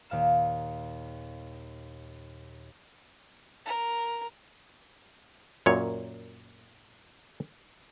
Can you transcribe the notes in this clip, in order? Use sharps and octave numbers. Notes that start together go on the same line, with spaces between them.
D#2 A#2 F5 A#5 E7
A#4
F#2 A#2 C#5